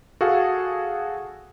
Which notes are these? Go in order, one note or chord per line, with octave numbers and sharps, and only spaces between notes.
F#4 G#4 A4 F5